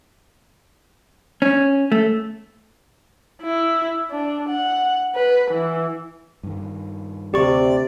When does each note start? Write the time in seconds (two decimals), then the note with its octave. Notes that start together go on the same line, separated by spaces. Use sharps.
1.42 C#4
1.92 A3
3.42 E4
4.11 D4
4.50 F#5
5.15 B4
5.51 E3
6.43 G2 D#3
7.34 D2 C3 G4 D5 C#6